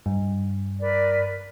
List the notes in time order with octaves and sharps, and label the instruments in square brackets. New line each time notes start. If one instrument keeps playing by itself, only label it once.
[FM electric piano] G2
[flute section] A#4 B4 D5